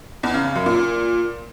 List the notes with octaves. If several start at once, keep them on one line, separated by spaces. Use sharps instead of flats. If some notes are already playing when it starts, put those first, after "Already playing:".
E2
C#3
C#3
F#2
A#2